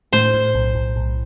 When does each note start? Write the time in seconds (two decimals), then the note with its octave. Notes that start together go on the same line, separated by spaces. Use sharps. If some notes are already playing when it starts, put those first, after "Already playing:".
0.13 A2 C5
0.34 A2
0.55 B1
0.75 B1
0.96 B1